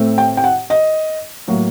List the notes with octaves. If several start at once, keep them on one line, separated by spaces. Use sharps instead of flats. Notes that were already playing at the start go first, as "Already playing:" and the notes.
Already playing: A2 A3 C4
G5
G5
F#5
D#5
A2 F#3 A#3